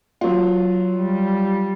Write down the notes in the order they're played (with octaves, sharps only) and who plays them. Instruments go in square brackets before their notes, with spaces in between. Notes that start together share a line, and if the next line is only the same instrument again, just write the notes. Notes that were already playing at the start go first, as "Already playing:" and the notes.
[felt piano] F#3 F4
[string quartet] G3